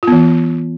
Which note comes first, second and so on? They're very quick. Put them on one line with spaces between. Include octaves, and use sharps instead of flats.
F4 B3 E3